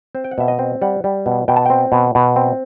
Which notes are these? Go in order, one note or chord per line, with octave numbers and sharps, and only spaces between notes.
C4 C5
G5
F#5
B2 E5
D#5
C4
G3 F#5
G3
B2
B2 G5
A5
C4 G5
B2
B2
C4